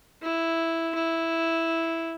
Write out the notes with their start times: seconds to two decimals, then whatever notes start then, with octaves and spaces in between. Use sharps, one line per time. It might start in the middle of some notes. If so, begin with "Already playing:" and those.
0.22 E4
0.95 E4